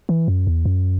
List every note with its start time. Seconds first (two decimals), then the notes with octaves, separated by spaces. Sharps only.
0.09 E3
0.28 F#2
0.47 E2
0.66 F#2